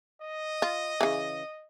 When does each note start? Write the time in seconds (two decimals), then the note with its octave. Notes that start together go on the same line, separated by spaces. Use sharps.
0.22 D#5
0.62 F4
1.01 C#3 E3